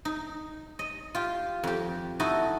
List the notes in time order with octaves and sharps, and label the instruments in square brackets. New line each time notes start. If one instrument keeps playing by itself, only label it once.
[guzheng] D#4
D#5
F4 G4
F2 G4
D#4 E4 F#4 A4 D#5